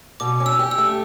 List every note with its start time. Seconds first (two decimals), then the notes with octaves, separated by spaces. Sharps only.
0.20 B2 D6
0.40 C#4
0.46 E6
0.59 G4
0.71 E6
0.78 A3